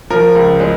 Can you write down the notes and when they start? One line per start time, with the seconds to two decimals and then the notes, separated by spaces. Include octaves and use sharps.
0.10 F3 A#4
0.35 C#2
0.60 G#3